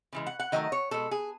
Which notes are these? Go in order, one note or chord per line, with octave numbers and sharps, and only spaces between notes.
C#3 E3 G#3
F#5
F#5
D#3 F#3 A3 D#5
C#5
B2 G#3 A4
G#4